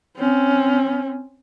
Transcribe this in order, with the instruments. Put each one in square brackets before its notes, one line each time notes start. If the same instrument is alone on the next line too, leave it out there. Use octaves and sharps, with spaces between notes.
[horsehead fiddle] C4 C#4